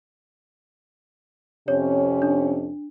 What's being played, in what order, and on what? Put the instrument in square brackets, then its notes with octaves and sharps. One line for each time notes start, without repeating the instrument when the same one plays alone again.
[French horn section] F2 C3 C#4 [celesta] C#5
[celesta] D4